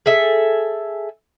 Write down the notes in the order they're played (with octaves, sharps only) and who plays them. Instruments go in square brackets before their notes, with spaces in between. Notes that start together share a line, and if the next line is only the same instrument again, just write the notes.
[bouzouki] G#4 A4 E5